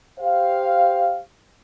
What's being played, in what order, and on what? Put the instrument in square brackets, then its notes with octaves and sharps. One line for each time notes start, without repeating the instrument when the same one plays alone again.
[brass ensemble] G4 C5 F5